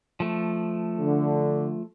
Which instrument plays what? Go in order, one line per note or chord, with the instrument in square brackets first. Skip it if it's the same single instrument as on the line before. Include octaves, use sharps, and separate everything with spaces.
[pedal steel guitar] F3 A3
[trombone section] D3